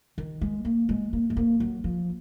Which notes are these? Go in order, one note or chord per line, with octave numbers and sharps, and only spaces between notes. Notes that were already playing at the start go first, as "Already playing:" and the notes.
D#3
G#3
A#3
G#3
A#3
G#3
A#3
F#3
F3